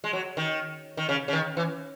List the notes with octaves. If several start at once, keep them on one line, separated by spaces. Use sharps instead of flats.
G#3
F#3
D#3
D#3
C#3
C#3
D#3
E3